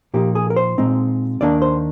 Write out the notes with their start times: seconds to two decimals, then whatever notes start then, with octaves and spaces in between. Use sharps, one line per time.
0.14 A#2 F3 A#3 D#4 G4
0.35 G#4
0.50 A#4
0.56 C5
0.78 A#2 G#3 C4 D#4
1.41 D#2 D#3 A#3 D4 D5
1.62 C5